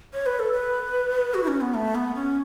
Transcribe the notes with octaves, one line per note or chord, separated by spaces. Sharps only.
C#5
B4
A4
B4
F#4
E4
C#4
B3
A3
B3
C#4